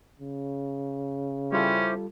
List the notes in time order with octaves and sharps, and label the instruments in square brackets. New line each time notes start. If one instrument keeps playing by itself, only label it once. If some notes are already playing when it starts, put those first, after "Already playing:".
[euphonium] C#3
[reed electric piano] G3 F4 A4 [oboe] C#4 [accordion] E4 G4 C5